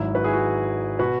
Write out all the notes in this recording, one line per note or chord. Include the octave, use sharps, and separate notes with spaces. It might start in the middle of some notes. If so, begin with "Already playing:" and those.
Already playing: G#1 G#2 F#3 E4
F#4 B4
E4 G#4
F#4
B2 F#4 B4